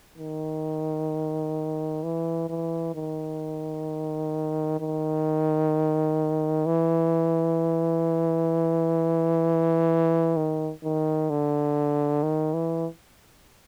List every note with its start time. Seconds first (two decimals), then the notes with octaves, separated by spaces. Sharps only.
0.18 D#3
2.03 E3
2.50 E3
2.95 D#3
4.80 D#3
6.66 E3
10.37 D#3
10.84 D#3
11.30 D3
12.23 D#3
12.54 E3